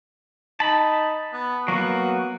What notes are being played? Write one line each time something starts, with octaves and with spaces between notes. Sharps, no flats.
D#4 A5 B5
B3
F#3 A#3 B3 F#4